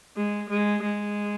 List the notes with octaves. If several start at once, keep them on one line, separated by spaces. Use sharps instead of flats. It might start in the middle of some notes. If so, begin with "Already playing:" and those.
G#3
G#3
G#3